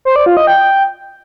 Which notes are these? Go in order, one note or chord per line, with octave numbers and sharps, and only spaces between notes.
C5
D5
F4
D#5
G5